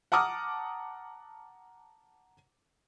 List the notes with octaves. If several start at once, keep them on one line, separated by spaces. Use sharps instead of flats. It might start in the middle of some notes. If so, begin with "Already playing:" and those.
F#5 A5 A#5 D6 D#6 F6